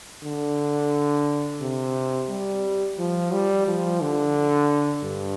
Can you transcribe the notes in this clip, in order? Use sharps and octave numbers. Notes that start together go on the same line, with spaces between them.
D3
C3
G3
F3
G3
F3
D3
G2